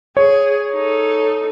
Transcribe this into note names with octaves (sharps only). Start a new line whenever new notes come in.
G#4 C#5
D#4 A4